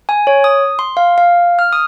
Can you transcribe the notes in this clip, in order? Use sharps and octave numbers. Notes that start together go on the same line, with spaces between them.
G#5
C#5
D#6
C6
F5
F5
F6
D#6